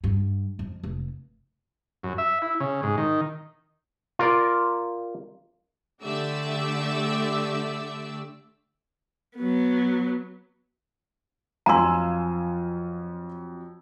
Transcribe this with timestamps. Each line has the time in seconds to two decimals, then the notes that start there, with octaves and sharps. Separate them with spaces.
0.04 G2
0.59 F2
0.83 F1
2.03 F#2
2.18 E5
2.42 E4
2.60 C#3
2.83 G#2
2.98 D#3
4.19 F4 A#4 D5
6.02 D3 A3 G4 D5 E5 E6
9.38 F#3 B3
11.66 F2 F3 F#3 F4 G#5 A#5 C6 E6